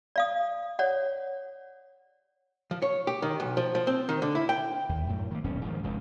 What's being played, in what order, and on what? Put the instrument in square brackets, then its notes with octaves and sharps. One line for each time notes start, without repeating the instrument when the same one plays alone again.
[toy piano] D5 F5 D#6
C#5 D5 F#5
[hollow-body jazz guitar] F3
C#5
G4
D#3
B1
F3
F3
C4
D#3
D3
E4
G5
[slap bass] D#2
F#2 A2
D#3 A#3
D#1 B1 G2 C#4
G#2 D#3 F3
F1 C#2 G2